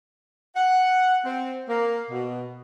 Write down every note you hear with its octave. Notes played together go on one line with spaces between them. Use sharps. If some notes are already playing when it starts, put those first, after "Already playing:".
F#5
C4
A#3
B2